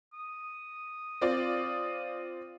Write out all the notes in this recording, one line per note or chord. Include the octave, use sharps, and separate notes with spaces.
D#6
C4 F4 D5